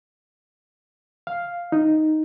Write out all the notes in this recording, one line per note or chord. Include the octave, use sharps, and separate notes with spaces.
F5
D#4